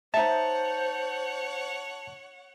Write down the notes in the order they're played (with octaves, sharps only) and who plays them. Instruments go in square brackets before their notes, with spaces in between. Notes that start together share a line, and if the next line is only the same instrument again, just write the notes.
[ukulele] D#4 E5 [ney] C5 [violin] C#5 F#5 [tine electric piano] A5